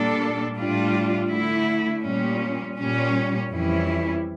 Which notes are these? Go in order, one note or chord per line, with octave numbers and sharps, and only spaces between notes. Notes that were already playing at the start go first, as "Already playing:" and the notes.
Already playing: A#2 G3 A#3 D4 A4
A2 G3 D4 F4
D3 A3 E4
A#2 G3 C#4
A#2 G3 C#4
F2 E3 G3 C#4 E4